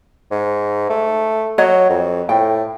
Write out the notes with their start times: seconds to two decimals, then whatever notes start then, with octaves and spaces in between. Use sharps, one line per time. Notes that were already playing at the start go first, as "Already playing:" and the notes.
0.31 G#2
0.90 A3
1.58 F#3 C#5 D#5
1.90 F2
2.29 A2 G5